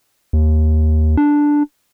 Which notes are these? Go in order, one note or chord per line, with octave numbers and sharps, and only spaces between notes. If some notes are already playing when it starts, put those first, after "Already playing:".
D#2
D4